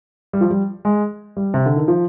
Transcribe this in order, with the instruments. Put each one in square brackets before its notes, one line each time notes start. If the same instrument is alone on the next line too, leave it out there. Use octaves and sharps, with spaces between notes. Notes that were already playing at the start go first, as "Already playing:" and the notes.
[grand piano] G3
F3
G3
G#3
G3
C3
D3
D#3
F3